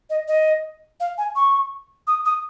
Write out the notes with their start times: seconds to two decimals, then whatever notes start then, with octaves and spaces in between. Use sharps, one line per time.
0.10 D#5
0.28 D#5
1.00 F5
1.18 G#5
1.36 C#6
2.07 D#6
2.25 D#6